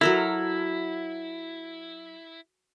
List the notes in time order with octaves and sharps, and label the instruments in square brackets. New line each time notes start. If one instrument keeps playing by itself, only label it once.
[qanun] F#3 A4 A#4 [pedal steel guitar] E4